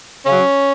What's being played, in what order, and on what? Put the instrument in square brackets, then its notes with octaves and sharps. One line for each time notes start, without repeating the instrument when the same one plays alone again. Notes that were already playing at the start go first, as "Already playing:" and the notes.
[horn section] C#3 F#3 C#4